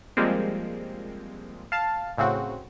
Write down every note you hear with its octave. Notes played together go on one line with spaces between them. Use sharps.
F3 G3 G#3 A#3 C4
F5 A5
A2 C#3 C4 F#4